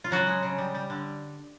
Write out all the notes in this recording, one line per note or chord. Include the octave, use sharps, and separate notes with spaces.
F4
C#3 F#3 F#4
G#3
C#3
G3
G3
D3